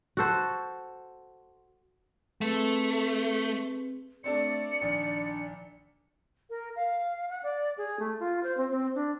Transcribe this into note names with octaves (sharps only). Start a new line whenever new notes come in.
F#4 A4 C5
A3 C4 G#4 B4
A3 C4 D4 A4 D5 C#7
A#1 D#3 D4
A#4
F5
F#5
D5
G#4
A3
F4
C5
C4
C4
D4